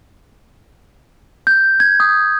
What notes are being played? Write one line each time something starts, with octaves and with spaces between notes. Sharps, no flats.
G6
G#6
D#6